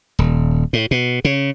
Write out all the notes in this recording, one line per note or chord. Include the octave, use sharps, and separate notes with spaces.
D#1
A2
B2
C#3